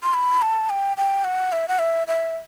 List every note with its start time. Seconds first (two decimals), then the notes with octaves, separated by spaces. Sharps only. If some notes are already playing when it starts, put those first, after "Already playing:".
0.03 C6
0.14 B5
0.42 A5
0.70 G5
0.97 G5
1.24 F#5
1.52 E5
1.68 F#5
1.79 E5
2.08 E5